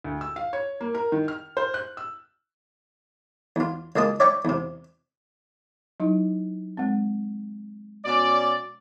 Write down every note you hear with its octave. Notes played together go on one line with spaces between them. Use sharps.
D2
E6
F5
C#5
A#3
A#4
D#3
F6
C5
F#6
E6
E2 F4
C#2 G#3 A#3 A5 D#6
C#5 D5 E5 G5 A#5 C#6
E2 C3
F#3 D#4 E4
G#3 C4
B2 C#4 D5